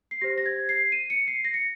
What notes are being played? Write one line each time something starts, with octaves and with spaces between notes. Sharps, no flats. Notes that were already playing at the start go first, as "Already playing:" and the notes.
C7
G4 C5 A#6
A#6
G#6
C7
D#7
C#7
C7
A#6
C#7